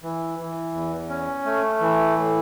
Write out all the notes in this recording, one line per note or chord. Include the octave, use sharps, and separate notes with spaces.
E3
E3
E2
C#4
A3
E3
A2